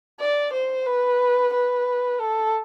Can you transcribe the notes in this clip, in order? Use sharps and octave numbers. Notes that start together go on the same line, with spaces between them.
D5
C5
B4
B4
A4